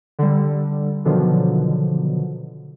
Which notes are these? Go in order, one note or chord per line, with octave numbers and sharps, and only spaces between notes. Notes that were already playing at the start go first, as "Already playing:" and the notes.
D3 G3
B2 D3 D#3 F3 F#3